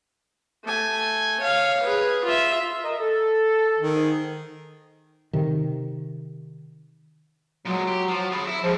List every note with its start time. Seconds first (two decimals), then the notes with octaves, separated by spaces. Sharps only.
0.64 A3 G#5
1.40 C#5 F5
1.83 G#4 B4
2.24 F4 E5
2.84 A#4 D#5
3.00 A4
3.78 D#3
3.94 G#2 G#4
5.33 C3 D#3
7.65 A#2 F#3 G#3
7.87 G4
8.08 F3
8.32 G#4 B5
8.47 E4 E5
8.64 G#2 D3 F3 G#4